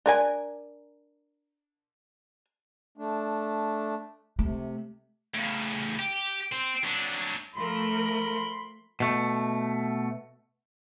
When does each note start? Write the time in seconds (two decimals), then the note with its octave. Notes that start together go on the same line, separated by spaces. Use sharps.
0.06 D4 A#4 G#5
2.97 A3 D4
4.39 C3 A3
5.35 A2 C#3
5.99 G4
6.52 C4
6.84 F#3 D4
7.55 F3 A3 A#4 B5 C6
9.00 B2 A3